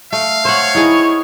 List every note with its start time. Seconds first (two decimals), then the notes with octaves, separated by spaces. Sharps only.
0.13 A3 F5
0.45 C5 C#5 F#5
0.75 D#4 E4 G#4